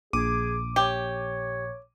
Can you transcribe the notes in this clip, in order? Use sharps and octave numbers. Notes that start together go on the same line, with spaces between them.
A#1 G#4 D6 D#7
G4 C#5